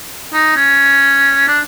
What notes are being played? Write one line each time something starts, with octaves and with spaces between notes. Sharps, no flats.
D#4
C#4
D4